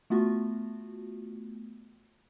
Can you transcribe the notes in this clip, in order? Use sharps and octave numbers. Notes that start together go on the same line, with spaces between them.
A3 B3 F4 F#4